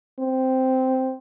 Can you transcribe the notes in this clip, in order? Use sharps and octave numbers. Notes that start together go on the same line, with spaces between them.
C4